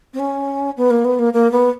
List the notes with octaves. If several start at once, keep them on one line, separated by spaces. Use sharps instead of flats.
C4
C#4
B3
A#3
B3
A#3
A#3
B3